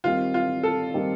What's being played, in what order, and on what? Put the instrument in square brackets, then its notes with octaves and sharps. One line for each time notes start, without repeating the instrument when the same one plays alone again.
[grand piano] D#3 G3 C4 [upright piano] F4
[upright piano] F4
A4
[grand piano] D#3 G3 C4